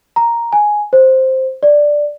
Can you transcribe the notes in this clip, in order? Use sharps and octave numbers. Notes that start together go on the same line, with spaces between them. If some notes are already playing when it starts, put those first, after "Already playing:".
A#5
G#5
C5
D5